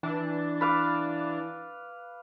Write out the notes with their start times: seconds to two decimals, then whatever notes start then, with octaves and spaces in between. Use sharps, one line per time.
0.03 E3 D4 A5
0.61 B4 F5 D6